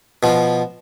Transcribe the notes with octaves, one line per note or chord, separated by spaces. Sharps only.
B2 F3